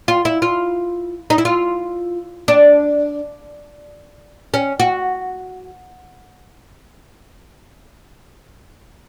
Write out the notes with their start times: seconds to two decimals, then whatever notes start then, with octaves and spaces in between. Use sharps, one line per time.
0.08 F4
0.25 E4
0.42 F4
1.30 D#4
1.38 E4
1.45 F4
2.48 D4
4.54 C#4
4.80 F#4